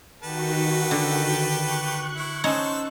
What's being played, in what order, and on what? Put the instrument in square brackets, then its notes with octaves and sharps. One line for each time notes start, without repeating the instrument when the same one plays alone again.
[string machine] D#3 F#4 [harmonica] G4 A4 B4
[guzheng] D3
[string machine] C#6 F#6
[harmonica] E4
[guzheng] C#4 D#4 C#5 [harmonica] A4 C5 E6